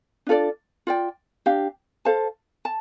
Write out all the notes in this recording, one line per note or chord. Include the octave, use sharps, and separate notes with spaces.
D4 F4 A4 D5
F4 D5 G5
D4 G4 F5
A4 C5 F5 A5
A5